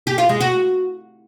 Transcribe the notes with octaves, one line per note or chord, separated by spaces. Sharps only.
G4
F4
G#3
F#4